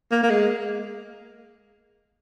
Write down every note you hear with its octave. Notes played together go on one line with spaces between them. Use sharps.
A#3
A#3
G#3